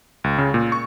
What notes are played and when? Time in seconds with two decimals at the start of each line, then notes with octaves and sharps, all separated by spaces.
0.24 C#2
0.38 C#3
0.54 A#2
0.72 C#6